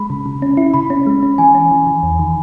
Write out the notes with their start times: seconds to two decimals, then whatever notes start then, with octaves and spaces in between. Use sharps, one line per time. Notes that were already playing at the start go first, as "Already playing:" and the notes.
Already playing: G#3 B5
0.10 C#3
0.26 C#3
0.42 C#4
0.57 E4
0.74 C#3 B5
0.90 C#4
1.07 G#3
1.23 C#4
1.38 E3 G#5
1.55 C#4
1.71 E3
1.87 E3
2.03 E2
2.19 D#3